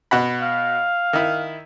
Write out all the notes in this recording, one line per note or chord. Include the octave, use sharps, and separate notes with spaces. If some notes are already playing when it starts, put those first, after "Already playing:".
B2 F#5 B5
F5
D#3 E4